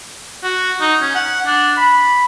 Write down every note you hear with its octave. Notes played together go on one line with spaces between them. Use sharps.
F#4
D#4
C#4
F#5
D4
B5